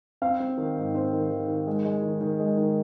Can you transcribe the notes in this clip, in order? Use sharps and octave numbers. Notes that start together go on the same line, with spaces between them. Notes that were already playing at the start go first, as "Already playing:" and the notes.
C4 F5
C4
D#3
G#2
C4 C5
D#3
D#3
D#3
G#3
G#3
D#3
D#3
G#3
D#3